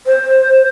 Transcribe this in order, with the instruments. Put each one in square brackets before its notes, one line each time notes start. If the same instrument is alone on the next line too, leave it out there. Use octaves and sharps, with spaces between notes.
[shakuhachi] C5